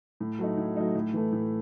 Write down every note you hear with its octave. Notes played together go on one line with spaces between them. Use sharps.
A2
F#3 A3 D#4
A2
F#3 A3 D#4
A2
E3 A3
A2